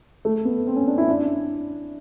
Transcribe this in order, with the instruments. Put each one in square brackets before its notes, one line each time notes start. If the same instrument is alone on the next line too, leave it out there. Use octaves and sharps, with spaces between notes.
[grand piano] A3
B3
C4
C#4
D4
E4
D4